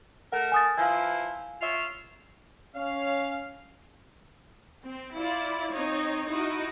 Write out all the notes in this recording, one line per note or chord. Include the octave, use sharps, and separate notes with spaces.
A3 A#4 F#5
G#5 D#6 A6
F3 E4 B4 F5 G#5
F4 C#5 E5
C#4 C#5 F5
C4
E4 F4 D5
C4 D#4 C#5
D#4 E4 F#4